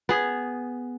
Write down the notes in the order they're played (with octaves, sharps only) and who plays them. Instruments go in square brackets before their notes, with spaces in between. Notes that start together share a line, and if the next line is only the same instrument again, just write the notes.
[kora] B3 G#4